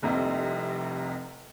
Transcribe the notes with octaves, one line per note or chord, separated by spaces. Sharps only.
F1 C2 F2 C3